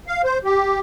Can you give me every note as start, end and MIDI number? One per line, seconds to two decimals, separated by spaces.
0.07 0.22 77
0.24 0.39 72
0.44 0.80 67